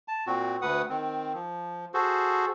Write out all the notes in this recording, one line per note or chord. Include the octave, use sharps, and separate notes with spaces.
A5
A#2 C4 F#4
D2 B4 F#5 D#6
D#3 C4
F3
F#4 G#4 A4 C5